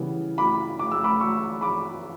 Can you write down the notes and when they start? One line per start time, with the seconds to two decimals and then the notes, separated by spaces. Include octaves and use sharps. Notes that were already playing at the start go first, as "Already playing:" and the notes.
Already playing: C#3 E3 G3 B3
0.38 B5 D6
0.79 D6
0.92 E6
1.04 B5 D6
1.20 C#6 E6
1.61 B5 D6